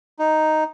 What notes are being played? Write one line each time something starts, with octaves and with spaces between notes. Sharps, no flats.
D#4